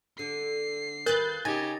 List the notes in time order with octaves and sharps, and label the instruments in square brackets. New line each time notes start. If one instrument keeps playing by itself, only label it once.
[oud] D3 [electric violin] C7
[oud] D#2 B4 [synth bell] A#4 [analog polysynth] F#6 G6 A6
[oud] C#3 [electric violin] D#4 G4 [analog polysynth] G#5 [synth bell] A6 A#6